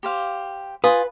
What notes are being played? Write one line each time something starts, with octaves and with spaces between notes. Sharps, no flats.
G4 C5 F5
F4 B4 G#5 D#6